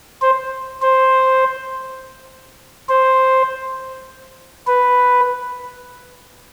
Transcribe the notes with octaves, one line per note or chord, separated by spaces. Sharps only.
C5
C5
C5
B4